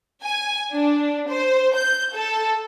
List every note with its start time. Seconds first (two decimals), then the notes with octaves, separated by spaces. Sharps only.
0.22 G#5
0.72 D4
1.30 C5
1.75 G6
2.14 A4